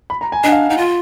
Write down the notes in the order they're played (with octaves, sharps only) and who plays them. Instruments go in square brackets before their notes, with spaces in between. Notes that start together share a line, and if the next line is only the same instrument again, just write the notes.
[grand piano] B5
A#5
G#5
[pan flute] D4 [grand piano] D#5
[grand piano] F#5
F5
[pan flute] D#4 [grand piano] F#5
[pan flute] F4 [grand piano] F5